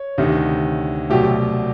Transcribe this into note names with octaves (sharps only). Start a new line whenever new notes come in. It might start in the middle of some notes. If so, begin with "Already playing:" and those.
Already playing: C#5
D2 C3 D#3
C2 B2 F#3 A3 G4